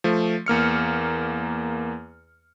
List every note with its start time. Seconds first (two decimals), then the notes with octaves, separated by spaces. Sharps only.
0.04 F3 A3
0.46 E2 A#3 F6 C#7